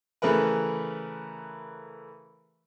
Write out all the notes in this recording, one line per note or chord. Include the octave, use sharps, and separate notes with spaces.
C#3 E3 A3 A#4 B4